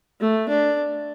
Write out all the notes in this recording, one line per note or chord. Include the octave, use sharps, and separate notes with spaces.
A3
D4